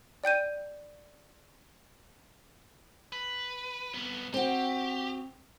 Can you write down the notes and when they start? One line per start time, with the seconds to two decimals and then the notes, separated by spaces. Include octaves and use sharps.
0.24 D5 G5 G6 D#7
3.12 B4
3.94 C2 B3
4.34 C4 F#4 G4